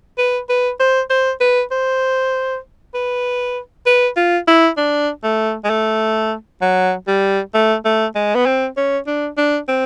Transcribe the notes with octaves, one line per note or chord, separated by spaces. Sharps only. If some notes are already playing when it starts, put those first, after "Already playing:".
B4
B4
C5
C5
B4
C5
B4
B4
F4
E4
D4
A3
G#3
A3
F#3
G3
A3
A3
G#3
B3
C4
C#4
D4
D4
C4